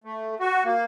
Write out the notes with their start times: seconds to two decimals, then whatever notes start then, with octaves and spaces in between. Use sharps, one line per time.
0.04 A3
0.40 F#4
0.64 A#3